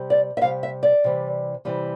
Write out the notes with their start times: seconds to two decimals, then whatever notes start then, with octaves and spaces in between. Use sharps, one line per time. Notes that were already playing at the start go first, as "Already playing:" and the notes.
Already playing: C3 G3
0.10 D5
0.37 E5
0.41 C3 F5
0.45 G3
0.63 E5
0.83 D5
1.04 C3 E3 G3
1.65 C3 E3 G3